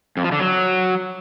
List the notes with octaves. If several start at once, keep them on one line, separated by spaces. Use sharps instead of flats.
F2
F3
D3
F#3